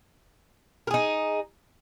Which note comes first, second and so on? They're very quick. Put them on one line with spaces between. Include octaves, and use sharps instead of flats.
A#4 G#4 D#4